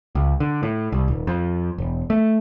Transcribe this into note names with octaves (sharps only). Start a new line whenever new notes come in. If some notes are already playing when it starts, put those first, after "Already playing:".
C#2
D3
A2
C2
D#1
F2
E1
A3